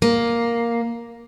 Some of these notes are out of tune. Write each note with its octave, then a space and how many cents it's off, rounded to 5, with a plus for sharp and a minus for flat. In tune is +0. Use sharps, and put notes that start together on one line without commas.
A#3 +5